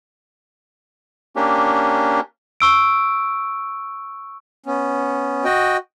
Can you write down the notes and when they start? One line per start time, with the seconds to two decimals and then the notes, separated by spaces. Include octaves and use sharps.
1.36 A#3 C#4 D4 G4
2.60 C#6 E6 D7
4.66 B3 C#4
5.45 F#4 D#5 G5